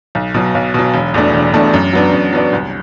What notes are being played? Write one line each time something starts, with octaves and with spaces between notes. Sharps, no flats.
B1
B2 F#3
B1
B2 F#3
E1
E2 B2 A3 D4
E1
E2 B2 A3 D4
F#2
F#3 B3 D4
F#2
F#3 B3 D4
C2